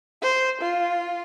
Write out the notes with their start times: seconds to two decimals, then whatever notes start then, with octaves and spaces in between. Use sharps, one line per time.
0.22 C5
0.61 F4